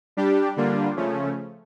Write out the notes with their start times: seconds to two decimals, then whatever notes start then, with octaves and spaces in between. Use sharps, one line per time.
0.17 G3 D4 G4
0.56 D3 G3 A#3 D4 F4
0.96 C#3 F3 A3 C#4